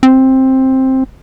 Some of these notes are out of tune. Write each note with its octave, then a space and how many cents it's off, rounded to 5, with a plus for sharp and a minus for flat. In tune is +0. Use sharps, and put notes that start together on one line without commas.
C4 +10